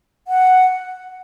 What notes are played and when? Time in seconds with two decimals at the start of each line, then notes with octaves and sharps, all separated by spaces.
0.28 F#5